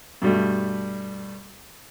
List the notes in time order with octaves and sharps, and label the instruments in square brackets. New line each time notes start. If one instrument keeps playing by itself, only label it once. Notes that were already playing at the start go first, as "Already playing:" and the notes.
[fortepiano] G2 B2 G3 A3